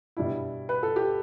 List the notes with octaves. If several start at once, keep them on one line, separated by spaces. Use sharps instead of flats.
B2 G3 D4 E4
B4
A4
G4